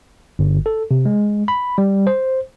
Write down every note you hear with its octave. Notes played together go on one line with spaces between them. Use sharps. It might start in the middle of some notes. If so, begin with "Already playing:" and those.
G1
A4
C3
G#3
B5
G3
C5